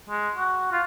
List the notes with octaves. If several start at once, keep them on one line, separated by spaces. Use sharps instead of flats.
G#3
F#4
F4